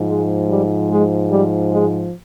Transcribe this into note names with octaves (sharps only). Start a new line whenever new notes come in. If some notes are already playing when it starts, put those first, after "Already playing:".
Already playing: G#2 F3
G#3
G3
G#3
G3
G#3